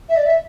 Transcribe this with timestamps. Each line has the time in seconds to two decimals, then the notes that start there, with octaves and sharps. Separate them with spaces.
0.09 E5
0.16 D5
0.26 E5